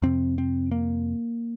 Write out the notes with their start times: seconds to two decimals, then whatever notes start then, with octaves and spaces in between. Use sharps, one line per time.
0.02 F2 C3 C4
0.38 C4
0.71 A#3